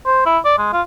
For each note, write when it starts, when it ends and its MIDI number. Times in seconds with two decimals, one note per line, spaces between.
0.06 0.26 72
0.26 0.39 64
0.45 0.57 74
0.58 0.70 56
0.73 0.82 65